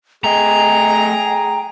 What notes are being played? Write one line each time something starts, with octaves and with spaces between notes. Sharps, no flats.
A3 G#4 D#5 G5 A#5